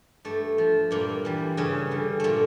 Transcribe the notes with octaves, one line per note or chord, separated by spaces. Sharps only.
G2 A3
F3
G2 A#2 A#3
E3 G3
G2 C#3 C#4
D3 G3
A#2 A3 A#3